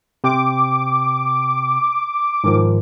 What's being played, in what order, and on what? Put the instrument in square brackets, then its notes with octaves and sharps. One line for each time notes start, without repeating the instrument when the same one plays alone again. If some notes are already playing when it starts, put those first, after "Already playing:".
[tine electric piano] C3 G5 [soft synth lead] D6
[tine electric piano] G#2 D#3 F3